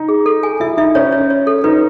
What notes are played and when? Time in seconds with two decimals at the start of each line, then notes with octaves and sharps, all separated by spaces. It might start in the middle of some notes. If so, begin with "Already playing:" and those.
Already playing: D#4
0.09 G#4
0.26 A4
0.43 G#5
0.60 E4 E5
0.77 D#4 E5
0.95 C#4 C#5
1.12 C#5
1.30 C#5
1.47 A4
1.64 D#4 B4